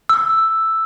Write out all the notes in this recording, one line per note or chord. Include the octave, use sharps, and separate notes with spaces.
E6